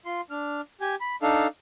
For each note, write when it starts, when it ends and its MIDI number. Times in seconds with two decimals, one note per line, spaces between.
0.06 0.21 65
0.06 0.21 84
0.30 0.61 62
0.30 0.61 89
0.81 0.95 67
0.81 0.95 80
1.01 1.16 83
1.22 1.47 62
1.22 1.47 63
1.22 1.47 69
1.22 1.47 77